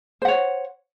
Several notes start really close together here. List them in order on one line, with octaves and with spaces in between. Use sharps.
C5 F#5 C#5